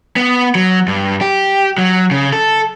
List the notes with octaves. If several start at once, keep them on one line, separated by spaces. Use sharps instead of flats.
B3
F#3
G2
G4
F#3
C#3
A4